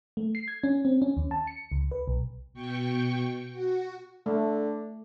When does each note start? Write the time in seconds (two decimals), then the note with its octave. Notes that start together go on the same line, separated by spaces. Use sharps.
0.17 A3
0.35 C7
0.48 G#6
0.64 C#4
0.85 C4
1.02 C#4
1.17 D#2
1.31 A5
1.47 C#7
1.72 C#2
1.91 B4
2.08 B1
2.54 B2 G5 C#6
3.52 F#4
4.26 D3 A3